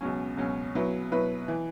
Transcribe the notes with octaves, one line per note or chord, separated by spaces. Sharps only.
C#2 B2 F#3 C#4
C#2 B2 F#3 C#4
B2 F#3 E4 B4
B2 F#3 E4 B4
E3